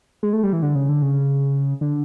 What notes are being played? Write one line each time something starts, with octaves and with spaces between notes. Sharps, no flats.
G#3
A3
G3
E3
D3
C#3
D3
C#3
D3